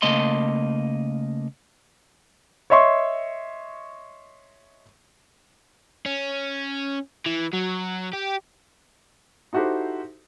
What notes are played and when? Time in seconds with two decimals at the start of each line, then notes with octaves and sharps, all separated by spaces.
0.02 C#3 A3 A#3 D#5 C6
2.70 C#5 D#5 E5 C6 C#6
6.06 C#4
7.26 E3
7.53 F#3
8.13 G4
9.53 D#4 E4 F#4 G4 A4 C5